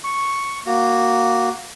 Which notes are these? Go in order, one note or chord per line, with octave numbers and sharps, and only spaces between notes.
C#6
A#3 F#4